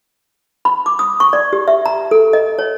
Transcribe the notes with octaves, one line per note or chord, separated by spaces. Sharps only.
B5
D6
D#6
C#6
D5
G4
E5
A#5
A4
D#5
C#5